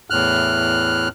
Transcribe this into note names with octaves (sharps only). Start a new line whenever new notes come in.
E2 A2 F6 F#6